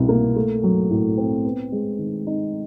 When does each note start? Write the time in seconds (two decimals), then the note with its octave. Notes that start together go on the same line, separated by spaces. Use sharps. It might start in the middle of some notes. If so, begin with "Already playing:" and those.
Already playing: C2 B2
0.09 A#3
0.36 A3
0.63 F#3
0.90 A2
1.17 C4
1.44 B3
1.72 G#3
1.99 D#3
2.27 D#4